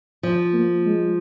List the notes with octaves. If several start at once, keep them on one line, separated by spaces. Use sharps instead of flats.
F3
A#3
G#3